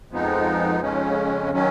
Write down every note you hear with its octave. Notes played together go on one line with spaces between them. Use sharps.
F2 F3 G#3 B3 D#4
F2 C#3 G#3 C#4
D#3 F#3 C#4